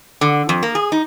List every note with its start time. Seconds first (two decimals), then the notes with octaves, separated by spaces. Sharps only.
0.21 D3
0.49 F2
0.63 A#3
0.75 G#4
0.92 D#4